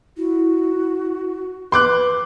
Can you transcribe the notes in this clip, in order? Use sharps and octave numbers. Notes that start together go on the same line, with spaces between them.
E4 F#4
B4 C6 D6 F#6